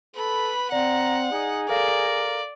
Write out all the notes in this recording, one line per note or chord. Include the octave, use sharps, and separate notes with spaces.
A4 B4 B5
C4 D5 F#5 A#5
D#4 G#4
A4 A#4 D5 F5 A#6